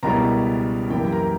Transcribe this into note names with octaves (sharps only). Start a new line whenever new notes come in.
C#2 B2 G3 C#4 E4 A#4 A#5
F#2 E3 A#3 E4 G4 G5
A#4 A#5